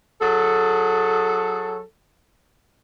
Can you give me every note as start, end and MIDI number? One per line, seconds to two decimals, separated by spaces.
0.20 1.82 54
0.20 1.82 68
0.20 1.82 69